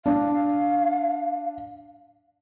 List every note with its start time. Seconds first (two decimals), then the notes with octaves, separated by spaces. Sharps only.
0.06 D4 F5